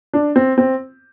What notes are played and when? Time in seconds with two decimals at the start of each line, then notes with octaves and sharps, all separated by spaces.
0.13 D4
0.36 C4
0.58 C4